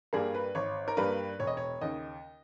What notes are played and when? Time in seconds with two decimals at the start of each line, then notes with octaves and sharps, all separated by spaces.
0.13 G2 G3 A#3 G#4
0.34 B4
0.55 G#1 C#5
0.88 A#4
0.97 G2 G3 A#3 B4
1.39 E1 C#5
1.47 D#5
1.57 C#5
1.81 D#2 C#3 D#5